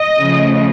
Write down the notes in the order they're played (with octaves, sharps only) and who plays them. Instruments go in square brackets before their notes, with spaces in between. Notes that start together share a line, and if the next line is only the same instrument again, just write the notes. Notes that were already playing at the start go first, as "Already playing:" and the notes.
Already playing: [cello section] D#5
C#3 F3 A3